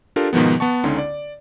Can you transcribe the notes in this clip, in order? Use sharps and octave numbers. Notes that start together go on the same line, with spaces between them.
D4 F4 G4 A4 A#4
G#2 B2 D#3 F3 B3
B3 F#5 A5 C#6
C#2 D3 C#4 D#4 C6
D5